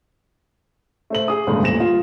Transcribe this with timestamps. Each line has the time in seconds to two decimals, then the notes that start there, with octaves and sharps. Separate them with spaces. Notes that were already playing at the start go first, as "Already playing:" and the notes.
1.10 A3 C5 F#7
1.28 G#4 D#6
1.47 G1 C#2 A2
1.62 D#1 A1 A#2 A#6 E7
1.80 F4